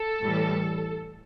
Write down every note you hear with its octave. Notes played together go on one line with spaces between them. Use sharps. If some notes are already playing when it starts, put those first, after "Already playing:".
Already playing: A4
A2 E3 G3